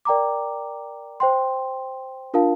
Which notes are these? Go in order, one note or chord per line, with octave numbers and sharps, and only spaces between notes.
A#4 D5 G5 A#5 D6
C5 G5 C6
D4 F4 A#4 F5 A5